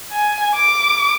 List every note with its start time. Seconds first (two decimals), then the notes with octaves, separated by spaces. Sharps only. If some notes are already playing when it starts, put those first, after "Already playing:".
0.12 G#5
0.55 D6